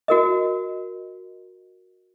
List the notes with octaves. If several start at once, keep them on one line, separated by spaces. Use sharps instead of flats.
F#4 A#4 D#5